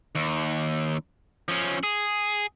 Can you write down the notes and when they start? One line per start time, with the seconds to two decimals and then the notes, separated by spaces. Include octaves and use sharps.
0.15 D#2
1.48 F3 C#4
1.83 G#4